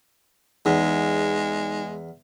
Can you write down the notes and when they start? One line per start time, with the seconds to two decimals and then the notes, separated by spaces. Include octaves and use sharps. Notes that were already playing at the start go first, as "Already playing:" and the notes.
0.66 E2 G#3 D#4